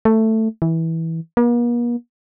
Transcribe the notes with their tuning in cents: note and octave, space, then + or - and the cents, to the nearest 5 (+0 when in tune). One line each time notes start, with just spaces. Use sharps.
A3 +10
E3 -15
A#3 +45